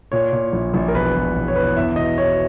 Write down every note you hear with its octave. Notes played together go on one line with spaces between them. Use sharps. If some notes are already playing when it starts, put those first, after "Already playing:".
A#2 C#5
A#2
A#1
A#1
A#4
E1 B4
E1
E1
C#5
E2 B4
E2 E5
E1 D#5
B2 C#5